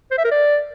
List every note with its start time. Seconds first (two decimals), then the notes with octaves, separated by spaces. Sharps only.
0.11 C5
0.18 E5
0.24 A#4
0.31 D5